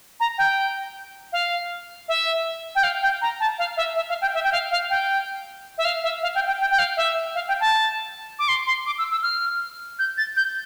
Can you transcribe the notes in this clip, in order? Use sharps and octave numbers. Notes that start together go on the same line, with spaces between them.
A#5
G5
F5
E5
G5
F5
G5
A#5
A5
F5
E5
E5
F5
G5
E5
G5
F5
F5
G5
E5
F5
E5
F5
G5
G5
G5
G5
F5
E5
F5
G5
A5
D6
C6
C6
D6
E6
E6
F6
G6
A6
G6